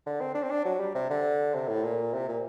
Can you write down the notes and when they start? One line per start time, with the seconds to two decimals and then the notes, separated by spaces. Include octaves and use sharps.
0.06 D3
0.21 C4
0.35 D4
0.43 C4
0.51 D4
0.65 F#3
0.80 G3
0.95 C3
1.10 D3
1.54 C3
1.68 A2
1.84 A#2
2.13 C3
2.29 A#2